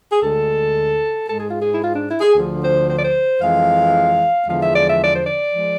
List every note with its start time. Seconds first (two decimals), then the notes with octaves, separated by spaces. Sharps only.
0.11 G#4
0.21 D2 D3 G#3 A4
1.27 G#2 G#3 A4
1.37 G#4
1.48 F4
1.58 G#4
1.75 E4
1.81 F4
1.94 D4
2.08 E4
2.21 G#4
2.34 D2 D3 F3
2.61 C5
2.88 C5
2.95 D5
3.02 C5
3.41 F2 E3 G#3 F5
4.47 E2 D3 F3 G#3 F5
4.60 E5
4.72 D5
4.85 E5
5.00 D5
5.13 C5
5.25 D5
5.54 F3 G#3